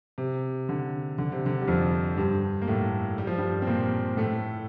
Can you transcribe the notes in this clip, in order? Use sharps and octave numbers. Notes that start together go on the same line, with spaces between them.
C3
D3
D3
C3
D3
G3
F2 F3
G2 G3
A#3
A2 A3
G3
F3
G2 G3
C4
A#2 A#3
A2 A3